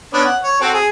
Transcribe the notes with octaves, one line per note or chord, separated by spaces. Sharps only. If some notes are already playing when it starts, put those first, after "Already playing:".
B3 C#4 D4
F#5
C#5
C4 F#4 A4
G#4